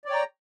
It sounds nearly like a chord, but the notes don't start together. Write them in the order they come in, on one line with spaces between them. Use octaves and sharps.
D5 C#5 G5 A#5